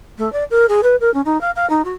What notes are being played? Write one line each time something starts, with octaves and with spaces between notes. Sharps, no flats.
A3
D5
A#4
G#4
B4
A#4
C#4
D#4
F5
F5
D#4
F#4